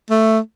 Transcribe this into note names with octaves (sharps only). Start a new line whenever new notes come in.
A3